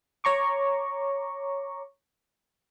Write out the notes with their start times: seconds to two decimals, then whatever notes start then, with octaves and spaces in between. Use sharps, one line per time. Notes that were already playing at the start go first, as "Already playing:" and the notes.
0.24 C#5 A#5 C#6 D6